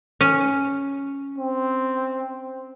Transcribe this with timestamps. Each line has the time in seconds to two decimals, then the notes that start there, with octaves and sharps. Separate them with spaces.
0.21 C#4
1.38 C4